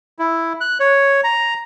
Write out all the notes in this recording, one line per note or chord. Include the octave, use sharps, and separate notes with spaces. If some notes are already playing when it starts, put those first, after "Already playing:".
E4
F#6
C#5
A#5